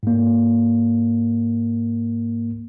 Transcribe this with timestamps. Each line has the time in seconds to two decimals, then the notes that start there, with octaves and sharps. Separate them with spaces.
0.03 G#2 A#3